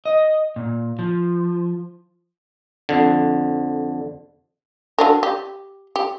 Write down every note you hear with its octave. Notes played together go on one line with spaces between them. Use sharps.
D#5
A#2
F3
F2 D3
F#3 D4 A#4
G4
G4